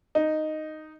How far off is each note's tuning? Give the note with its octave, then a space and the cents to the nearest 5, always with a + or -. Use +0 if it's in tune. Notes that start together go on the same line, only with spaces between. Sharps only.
D#4 -5